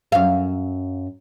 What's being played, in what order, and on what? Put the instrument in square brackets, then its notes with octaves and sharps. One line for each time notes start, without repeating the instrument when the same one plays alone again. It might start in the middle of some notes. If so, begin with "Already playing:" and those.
[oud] F#2 F5